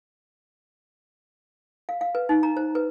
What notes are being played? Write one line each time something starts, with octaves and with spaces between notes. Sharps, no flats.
F5
F5
B4
D#4
A#5
C5
B4